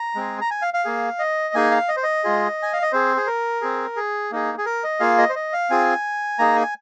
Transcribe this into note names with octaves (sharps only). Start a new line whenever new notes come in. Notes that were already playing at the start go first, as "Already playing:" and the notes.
Already playing: A#5
G#3 C4 G#4
A#5
G#5
F5
F5
A#3 G#4
D#5
A#3 D#4 G#4 G#5
F5
D#5
C5
D#5
G#3 F4 G#4
G#5
F5
D#5
C4 G#4 C5
G#4
A#4
C4 G#4
G#4
A#3 D#4 G#4
G#4
A#4
D#5
A#3 F4 G#4 F5
D#5
C5
D#5
F5
C4 F4 G#4 G#5
A#3 D#4 G#4 A#5
G#5